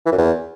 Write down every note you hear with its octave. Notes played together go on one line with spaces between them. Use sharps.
E3
F#2
E2